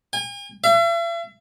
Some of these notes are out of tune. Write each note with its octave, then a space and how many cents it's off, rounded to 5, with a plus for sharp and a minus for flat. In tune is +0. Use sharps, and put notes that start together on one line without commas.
G#5 -45
E5 +45